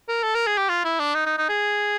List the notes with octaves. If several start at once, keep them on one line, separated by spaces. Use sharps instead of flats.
A#4
A4
A#4
G#4
G4
F4
E4
D4
D#4
D#4
D#4
G#4